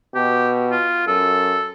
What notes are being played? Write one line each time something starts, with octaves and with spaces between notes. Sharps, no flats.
B2 G4
F4
F#2 A4